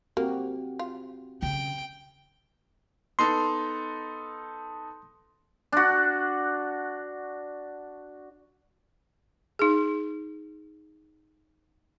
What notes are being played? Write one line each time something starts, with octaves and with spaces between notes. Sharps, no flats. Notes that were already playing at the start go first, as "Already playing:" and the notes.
A#3 C4 F#4 G4
F4
C#3 G5
B3 D#4 A4 C6
D4 F#4
D#4 G#4